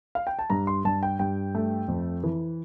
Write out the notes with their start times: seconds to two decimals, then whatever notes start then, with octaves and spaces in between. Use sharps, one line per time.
0.15 F5
0.27 G5
0.39 A5
0.50 G2 A#5
0.67 C6
0.85 G2 A5
1.03 G5
1.19 G2 G5
1.55 A3
1.88 F2
2.24 E3